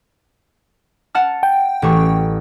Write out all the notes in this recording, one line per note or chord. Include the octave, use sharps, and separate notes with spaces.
F#5 A5 F6
G5
A1 G4 C#6